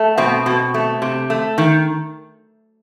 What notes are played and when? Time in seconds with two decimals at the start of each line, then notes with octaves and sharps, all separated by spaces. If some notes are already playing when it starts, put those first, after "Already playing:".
Already playing: A3
0.18 B2 C4
0.46 B2
0.74 A3
1.02 C3
1.30 A3
1.58 D#3